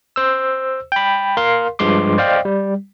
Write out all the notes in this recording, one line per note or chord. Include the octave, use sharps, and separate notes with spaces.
C5 E6
G5 B5
A#4 F5 C6
G2 F3 G#3 C6 D6
C5 D5 D#5 F5 G5
G3